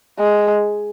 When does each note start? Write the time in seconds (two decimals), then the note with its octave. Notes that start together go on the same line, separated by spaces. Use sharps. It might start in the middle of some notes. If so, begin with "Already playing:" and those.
0.19 G#3